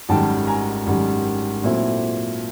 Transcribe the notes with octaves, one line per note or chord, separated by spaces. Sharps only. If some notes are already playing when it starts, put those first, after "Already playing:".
G#1 F#2 D#3 G3 G5 A5
G#5 A#5
G#1 F#2 D#3 G3
A#2 F#3 A3 C4 E4